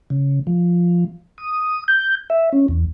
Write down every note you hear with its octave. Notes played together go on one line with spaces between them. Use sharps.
C#3
F3
D#6
G6
E5
C#4
E2